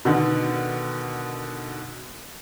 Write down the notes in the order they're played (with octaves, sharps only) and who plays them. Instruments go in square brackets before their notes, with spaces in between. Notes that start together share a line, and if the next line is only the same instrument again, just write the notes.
[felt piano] B2 D3 D#3